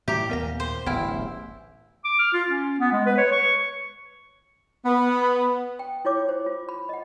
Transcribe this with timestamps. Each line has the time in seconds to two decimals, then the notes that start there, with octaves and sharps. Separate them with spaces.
0.08 A2 G3 G4 E5 A#5
0.29 D#2 A#2 B3 A#4 A#6
0.60 C5
0.86 D1 A1 G2 B3 E4 G5 F6
2.05 D6
2.19 F6
2.34 F4
2.48 C#4
2.80 B3
2.93 G#3
3.06 B4
3.18 C#5
3.32 C#6
4.85 B3
5.79 G5
6.05 E4 F4 C#5 D6
6.29 E4 C5
6.46 F4
6.69 B5
6.89 D#5 F#5